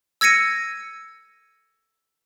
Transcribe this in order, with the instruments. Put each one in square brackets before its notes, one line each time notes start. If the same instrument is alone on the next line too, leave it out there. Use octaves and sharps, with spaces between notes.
[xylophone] E6 G#6 A#6 C#7 D#7